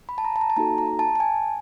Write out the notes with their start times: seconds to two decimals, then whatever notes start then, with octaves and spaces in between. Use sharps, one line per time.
0.09 B5
0.18 A5
0.25 A#5
0.36 A5
0.41 A#5
0.50 A5
0.56 A#3 D#4 F#4 A4 A#5
0.78 A#5
0.99 A5
1.15 A5
1.20 G#5